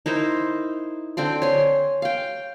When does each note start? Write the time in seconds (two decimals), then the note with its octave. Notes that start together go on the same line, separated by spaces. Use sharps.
0.06 D#4 E4 A#4 C5
1.17 D3 C4 G5 C6
1.42 C#5 G#5 C6
2.02 F5 G5